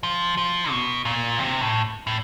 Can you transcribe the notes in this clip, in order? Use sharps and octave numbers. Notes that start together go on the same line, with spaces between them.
F3
F3
B2
A#2
C3
A2
A2